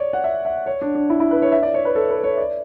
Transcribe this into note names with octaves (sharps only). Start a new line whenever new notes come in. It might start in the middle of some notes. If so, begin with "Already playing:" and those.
Already playing: C#5 D5
F#5
E5
E5
C#5
D4
D4
E4
E4
B4
C#5
E5
D5
C#5
B4
A4
B4
C#5
D5